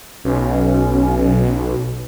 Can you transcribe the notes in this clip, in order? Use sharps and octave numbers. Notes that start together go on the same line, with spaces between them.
B1 C#4